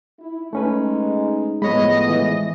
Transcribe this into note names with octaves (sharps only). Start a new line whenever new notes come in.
E4
G#3 A3 C#4 D#4 B4
A2 F3 G#3 B3 C#5 D#5 B5
E3